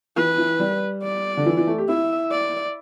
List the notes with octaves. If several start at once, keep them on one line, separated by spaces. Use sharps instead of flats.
E3 B4
E3
G3
D5
D3
E3
E3
A3
G4
E4 E5
D5